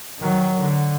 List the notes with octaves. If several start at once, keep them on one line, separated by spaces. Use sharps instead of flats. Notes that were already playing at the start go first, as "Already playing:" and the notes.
D#3 F#3
D3